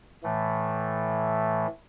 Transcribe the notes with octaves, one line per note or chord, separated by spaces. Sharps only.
A2 E3 A3